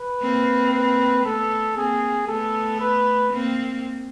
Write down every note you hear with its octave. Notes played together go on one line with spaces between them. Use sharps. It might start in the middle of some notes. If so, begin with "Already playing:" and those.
Already playing: B4
A#3 C4
B4
A3 B3 A4
A#3 C4 G#4
A3 B3 A4
B4
A#3 C4